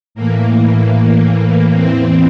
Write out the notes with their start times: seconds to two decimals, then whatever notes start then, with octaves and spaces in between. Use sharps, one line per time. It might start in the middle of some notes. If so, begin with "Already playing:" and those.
0.15 A2 E3 A#3
1.73 E2 E3 C4